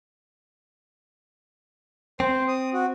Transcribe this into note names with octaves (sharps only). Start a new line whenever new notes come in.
C4 C5
D#6
F#4